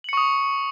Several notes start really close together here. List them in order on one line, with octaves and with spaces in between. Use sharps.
F#7 C#7 C#6 D#6